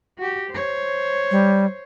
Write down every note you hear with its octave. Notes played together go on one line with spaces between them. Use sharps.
F#4 G4
C5 C#5
G3